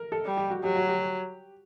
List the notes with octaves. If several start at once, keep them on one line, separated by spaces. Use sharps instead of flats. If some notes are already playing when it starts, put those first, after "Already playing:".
Already playing: A#4
A4
G3
G4
F#4
F#3 G4
F#4
G4